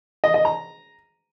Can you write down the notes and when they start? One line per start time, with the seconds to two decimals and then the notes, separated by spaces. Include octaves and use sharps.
0.24 D#5
0.34 D#5
0.45 A#5